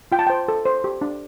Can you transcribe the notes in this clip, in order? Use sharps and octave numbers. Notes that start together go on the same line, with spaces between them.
F4 G5
A5
C5 G5
A4
C5
G4
D4